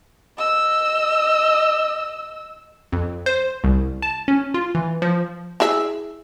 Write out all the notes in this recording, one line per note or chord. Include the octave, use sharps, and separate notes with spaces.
D#5 E6
F2
C5
C2
A5
C#4
F4
E3
F3
E4 G#4 E5